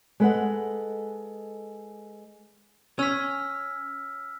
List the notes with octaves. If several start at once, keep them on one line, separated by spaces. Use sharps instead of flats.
G#3 A4 B4 D5 D#5 F#5
C#4 E6 F6 B6